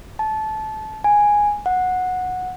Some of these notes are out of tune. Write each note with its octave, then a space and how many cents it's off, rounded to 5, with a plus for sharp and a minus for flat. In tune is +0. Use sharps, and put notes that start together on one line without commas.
A5 -20
G#5 -5
F#5 -10